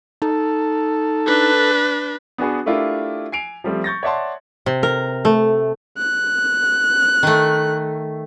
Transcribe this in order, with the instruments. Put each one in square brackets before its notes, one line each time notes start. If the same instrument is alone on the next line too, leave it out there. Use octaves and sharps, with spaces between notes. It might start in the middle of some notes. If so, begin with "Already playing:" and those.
[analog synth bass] D#4 [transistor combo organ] A4
[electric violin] D4 B4
[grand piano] B3 D4 F#4 G#4 B4
A3 D4 E4 F4 G4 A#4
G#5 C7 D7 F7
F3 G3 A3 C4
C#6 G6 A6 A#6
C#5 D5 E5 F#5 A5 C6
[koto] C3
A#4
A3
[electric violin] F#6
[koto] D#3 A3